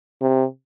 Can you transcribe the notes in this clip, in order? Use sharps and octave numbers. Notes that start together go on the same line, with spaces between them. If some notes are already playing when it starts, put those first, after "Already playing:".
C3